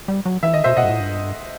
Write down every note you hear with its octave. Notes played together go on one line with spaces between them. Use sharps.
G3
F#3
E3 E5
D#3 D#5
B2 C5 E5
B2 D#5 F#5
G2
A2
G2